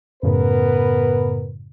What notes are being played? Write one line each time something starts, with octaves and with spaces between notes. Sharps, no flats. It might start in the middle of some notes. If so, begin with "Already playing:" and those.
F#2 A2 C#3 B3 A#4 B4